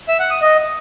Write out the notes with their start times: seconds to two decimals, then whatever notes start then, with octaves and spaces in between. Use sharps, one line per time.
0.08 E5
0.19 F#5
0.30 D#6
0.42 D#5